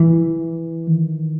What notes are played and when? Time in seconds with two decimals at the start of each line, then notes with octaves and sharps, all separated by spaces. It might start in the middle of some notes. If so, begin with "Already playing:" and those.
Already playing: E3
0.87 D#3